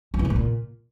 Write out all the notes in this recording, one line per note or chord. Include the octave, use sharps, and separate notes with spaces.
F3
E3
B2
A2
A#2